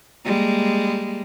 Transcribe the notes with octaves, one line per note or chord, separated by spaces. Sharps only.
G3 G#3 A#3